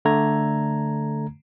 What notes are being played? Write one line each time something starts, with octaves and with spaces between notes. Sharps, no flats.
D3 A3 A#5 G#6